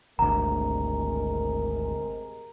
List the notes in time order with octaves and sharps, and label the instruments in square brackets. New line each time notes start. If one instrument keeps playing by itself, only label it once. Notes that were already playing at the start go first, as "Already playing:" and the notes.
[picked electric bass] G#1 D2 [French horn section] C3 G#3 A#4 [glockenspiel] A#5